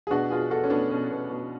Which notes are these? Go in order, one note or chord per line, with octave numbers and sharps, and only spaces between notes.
G#4
B2 D4 F#4
B2 F4 G#4
B2 F#4 A4
C#4
B2 B3 D4
B2 C#4
B2
B2